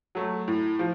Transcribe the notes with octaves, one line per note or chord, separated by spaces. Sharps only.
F#3 A3
A2
F3